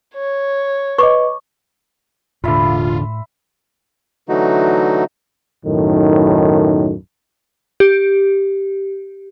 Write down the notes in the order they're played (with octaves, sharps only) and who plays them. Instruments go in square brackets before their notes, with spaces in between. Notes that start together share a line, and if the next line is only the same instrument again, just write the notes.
[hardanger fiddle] C#5
[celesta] B4 D#5 [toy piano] C#6 D6
[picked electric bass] E1 D3 [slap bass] A2 [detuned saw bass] F4 [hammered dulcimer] E5 B5 C6
[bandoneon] D3 E3 F#3 A3 D#4 F#4
[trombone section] B1 F#2 A2 D#3
[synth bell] G4